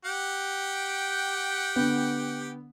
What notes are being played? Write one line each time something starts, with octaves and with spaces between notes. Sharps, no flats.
G4 F#5 G5
D3 B3